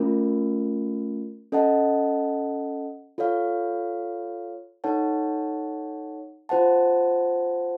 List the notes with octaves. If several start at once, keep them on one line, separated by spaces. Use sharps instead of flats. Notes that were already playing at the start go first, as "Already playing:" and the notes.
Already playing: A3 C#4 F4 A#4
C#4 A4 D#5 F#5 A5
F4 A4 C#5 F5
D#4 A4 C#5 F#5 A5
F4 C5 F#5 A5